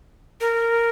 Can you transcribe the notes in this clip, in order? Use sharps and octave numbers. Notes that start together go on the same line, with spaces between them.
A#4